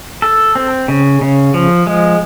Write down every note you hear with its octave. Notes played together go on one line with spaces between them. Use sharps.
A4
C4
C#3
C#3
F3
G#3